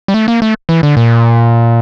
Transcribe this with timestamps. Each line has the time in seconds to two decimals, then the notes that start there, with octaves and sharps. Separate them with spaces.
0.08 G3
0.14 A3
0.28 A#3
0.42 A3
0.69 E3
0.83 D3
0.97 A#2